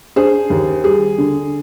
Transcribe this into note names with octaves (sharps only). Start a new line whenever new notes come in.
D4 G#4 C5
D#2
G3 G#4
D3